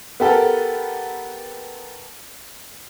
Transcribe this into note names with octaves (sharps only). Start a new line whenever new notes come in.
B3 G4 A4 A#4